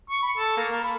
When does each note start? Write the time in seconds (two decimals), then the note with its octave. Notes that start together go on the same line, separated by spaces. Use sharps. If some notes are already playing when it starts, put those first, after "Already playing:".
0.10 C#6
0.22 B5
0.37 A4
0.57 A#3
0.72 A#4
0.83 B5